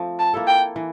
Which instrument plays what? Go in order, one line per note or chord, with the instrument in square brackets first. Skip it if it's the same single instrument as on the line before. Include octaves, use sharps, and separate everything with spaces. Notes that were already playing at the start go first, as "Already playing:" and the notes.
Already playing: [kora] F3 A3 C4
[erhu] A5
[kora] A#3 E4 A4
[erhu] G5
[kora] E3